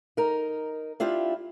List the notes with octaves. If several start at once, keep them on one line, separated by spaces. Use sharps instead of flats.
D#4 A#4
D4 E4 F4 G4